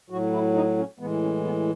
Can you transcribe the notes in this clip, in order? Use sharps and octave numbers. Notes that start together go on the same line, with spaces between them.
A2 F#3 F#4
E4
D#4
C#4
A2 E3 G#3 B3
C#4
B3